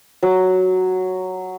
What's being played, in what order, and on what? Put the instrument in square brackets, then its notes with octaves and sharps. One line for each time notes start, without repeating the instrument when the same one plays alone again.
[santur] F#3